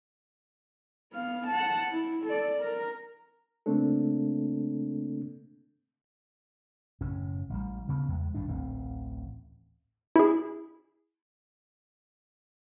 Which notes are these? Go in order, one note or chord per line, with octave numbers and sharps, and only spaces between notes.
B3 F5
F#5 A5
E4
A4 D5
A#4 A#5
C#3 A3 A#3 C4 D4 A4
F#1 A2 C#4
A1 G3
D2 C#3 B3
E2 G#3
G#1 G2 D#3 D4
D1 A1 C4
E4 G#4